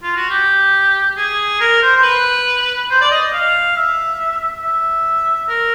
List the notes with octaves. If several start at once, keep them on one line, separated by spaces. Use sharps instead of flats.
F4
F#4
G4
G#4
A#4
C5
C5
B4
C5
D5
D#5
F5
E5
E5
A#4